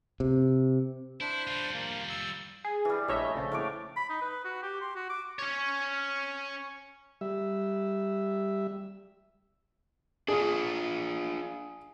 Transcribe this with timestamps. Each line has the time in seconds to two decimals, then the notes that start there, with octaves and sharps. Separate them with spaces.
0.20 C3
1.21 D4 E4 C5
1.47 G3 F4
1.74 A#3
2.10 E6
2.65 G#4
2.85 E3 G3
3.08 A#1 A3 C#5 D#5 E5
3.35 A#2 C#3 F3
3.52 A2 C#5 D6
3.96 B5
4.09 D#4
4.21 B4
4.45 F#4
4.62 G4
4.81 C6
4.96 F#4
5.10 D6
5.39 C#4 C#5
7.21 G3 E5
10.28 D4 F4 G#4 D#6